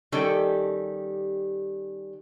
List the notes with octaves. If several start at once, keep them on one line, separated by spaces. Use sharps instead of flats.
D#3 G3 C#4 G4 A4 G5